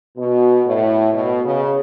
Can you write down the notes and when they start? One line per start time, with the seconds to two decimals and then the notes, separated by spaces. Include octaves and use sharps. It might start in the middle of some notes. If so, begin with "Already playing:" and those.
0.17 B2
0.66 A2
1.13 B2
1.44 C#3